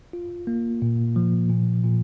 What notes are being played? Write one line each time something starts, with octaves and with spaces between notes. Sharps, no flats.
F4
A#3
A#2
F3
A#2
A#2